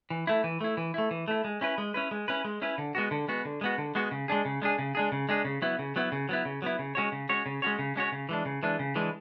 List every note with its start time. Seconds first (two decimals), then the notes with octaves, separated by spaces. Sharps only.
0.10 E3
0.27 A3 E4
0.44 E3
0.61 A3 E4
0.77 E3
0.94 A3 E4
1.11 E3
1.28 A3 E4
1.44 G#3
1.61 C#4 E4 B4
1.78 G#3
1.94 C#4 E4 B4
2.11 G#3
2.28 C#4 E4 B4
2.45 G#3
2.62 C#4 E4 B4
2.78 D3
2.95 G#3 B3 F#4
3.11 D3
3.28 G#3 B3 F#4
3.45 D3
3.61 G#3 B3 F#4
3.78 D3
3.95 G#3 B3 F#4
4.11 C#3
4.28 G#3 D4 G#4
4.45 C#3
4.62 G#3 D4 G#4
4.79 C#3
4.95 G#3 D4 G#4
5.12 C#3
5.29 G#3 D4 G#4
5.45 C#3
5.62 F#3 B3 E4
5.79 C#3
5.96 F#3 B3 E4
6.12 C#3
6.29 F#3 B3 E4
6.45 C#3
6.62 F#3 B3 E4
6.79 C#3
6.95 G#3 C#4 F#4 C#5
7.12 C#3
7.29 G#3 C#4 F#4 C#5
7.46 C#3
7.62 G#3 C#4 F#4 C#5
7.79 C#3
7.96 G#3 C#4 F#4 C#5
8.12 C#3
8.29 E3 G#3 D4
8.45 C#3
8.63 E3 G#3 D4
8.79 C#3
8.95 E3 G#3 D4